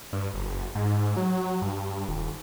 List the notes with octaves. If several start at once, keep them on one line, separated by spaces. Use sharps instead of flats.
G2
F#1
G#2
F#3
G2
D#1